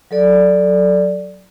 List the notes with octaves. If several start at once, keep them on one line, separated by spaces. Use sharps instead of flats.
F#3 A4 D5